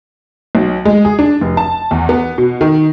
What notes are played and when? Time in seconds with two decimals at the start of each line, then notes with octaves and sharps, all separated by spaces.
0.55 B1
0.85 G#3
1.05 G#4
1.19 D4
1.41 F1
1.57 A5
1.91 E2
2.09 B3
2.38 B2
2.61 D#3